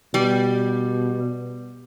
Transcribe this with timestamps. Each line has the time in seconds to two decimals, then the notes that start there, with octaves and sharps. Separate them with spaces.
0.14 B2 G3